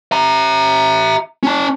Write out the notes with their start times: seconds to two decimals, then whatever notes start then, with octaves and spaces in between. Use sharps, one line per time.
0.12 E5 A#5
1.43 C#4 A5